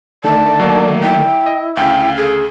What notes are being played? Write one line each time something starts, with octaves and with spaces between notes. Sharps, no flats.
D3 D#3 A3 D5 A5
F#3 A#3
E4 G5
D#5
D2 C#3 F5 G5
G#4 A4